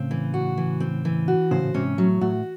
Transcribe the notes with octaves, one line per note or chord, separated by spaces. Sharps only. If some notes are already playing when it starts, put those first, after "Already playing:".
Already playing: A2 C#3 C4
E3
F#4
E3
C4
E3
F#4
A2 C#3 C5
A2
G#2 C3 C#4
A2 F#3
A2 F#4